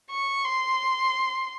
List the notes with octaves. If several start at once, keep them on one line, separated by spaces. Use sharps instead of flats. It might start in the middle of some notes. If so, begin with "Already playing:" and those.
C#6
C6